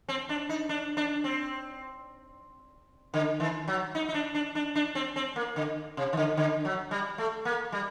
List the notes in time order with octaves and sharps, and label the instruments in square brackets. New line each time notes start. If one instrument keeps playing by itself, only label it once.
[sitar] C4
D4
D#4
D4
D4
C4
D3
D#3
F#3
D#4
D#4
D4
D4
D4
D4
C4
C4
A#3
D3
C3
D#3
D3
D3
F#3
G3
A3
A#3
G3